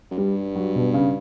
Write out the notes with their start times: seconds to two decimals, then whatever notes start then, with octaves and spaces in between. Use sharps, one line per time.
0.11 F#2
0.18 G2 G3
0.55 F#3
0.75 B2
0.94 C#3